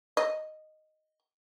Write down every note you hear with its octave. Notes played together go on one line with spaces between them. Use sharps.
D#5